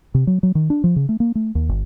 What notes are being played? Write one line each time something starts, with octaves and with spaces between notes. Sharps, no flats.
C3
F#3
F#3
D#3
D4
F3
C#3
A3
A#3
A3
D#2
G1